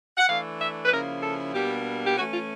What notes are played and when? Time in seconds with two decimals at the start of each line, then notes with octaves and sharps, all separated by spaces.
0.17 F#5
0.26 E3 A3 D4 F5
0.58 E5
0.85 B4
0.90 C#3 F3 A#3 C#4 E4 A#4
1.22 A4
1.53 B2 G3 A#3 D4 G4
2.06 G4
2.17 E3 A3 C#4 F#4
2.34 F4